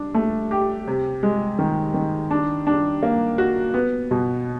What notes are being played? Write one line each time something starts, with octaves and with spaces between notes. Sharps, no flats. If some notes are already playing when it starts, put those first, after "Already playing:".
Already playing: D4
A3
G4
C3
G#3
D#3
D#3
D4
D4
A#3
F#4
B3
B2